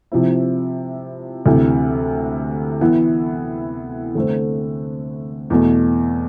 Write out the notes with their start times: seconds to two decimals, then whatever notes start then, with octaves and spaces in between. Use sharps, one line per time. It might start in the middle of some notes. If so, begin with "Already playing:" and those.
0.12 C3 F3 C4 E4
1.46 D2 C3 E3
2.81 E3 B3 E4
4.15 D3 A3 C4
5.50 E2 B2 A3